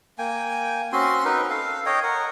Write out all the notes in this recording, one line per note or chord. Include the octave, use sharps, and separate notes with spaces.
A#3 G5 G#5
C4 C#4 F#4 C6
D#4 A#4 B4
A4 F5
C#5 D#5 G5
A#4 F#5